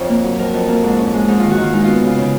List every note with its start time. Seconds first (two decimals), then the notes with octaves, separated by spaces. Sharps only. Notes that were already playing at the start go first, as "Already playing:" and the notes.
Already playing: F2 C#5
0.09 A#3
0.24 F#3
0.39 F2 A#4
0.54 F2
0.69 A#3
0.83 G#2
0.98 C#4
1.13 G#3
1.28 G#2 D#4
1.40 D#3 F4
1.51 F#4
1.58 D#3 F4
1.73 G#3 D#4
1.84 B3 F4
2.03 C#3 F4
2.18 C#3